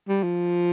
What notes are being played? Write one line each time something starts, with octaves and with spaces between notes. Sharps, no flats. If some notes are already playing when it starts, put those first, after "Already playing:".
G3
F3